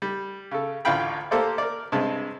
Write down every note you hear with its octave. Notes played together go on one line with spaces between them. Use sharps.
G3
C#3 A4
A1 D2 F4 F5 G5 B5
A#3 G4 A4 C5 D5
A#4 D5
G2 C3 G#3 A5